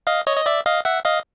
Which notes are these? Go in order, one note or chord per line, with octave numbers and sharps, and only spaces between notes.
D#5 F5
C#5 D#5
D#5
D5 E5
D#5 F5
E5 F#5
D#5 F5